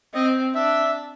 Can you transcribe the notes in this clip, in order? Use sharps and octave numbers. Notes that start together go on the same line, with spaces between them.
C4 D#5
D4 E5